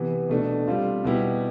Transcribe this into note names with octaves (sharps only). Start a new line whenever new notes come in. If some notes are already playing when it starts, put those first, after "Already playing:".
Already playing: C3 E3 B3
B2 A3 D4
G3 C4 F4
B2 G3 B3 E4 G4